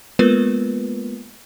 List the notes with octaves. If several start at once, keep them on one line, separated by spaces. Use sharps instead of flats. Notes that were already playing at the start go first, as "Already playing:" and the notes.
G#3 A#3 B3 F4 A#4 B4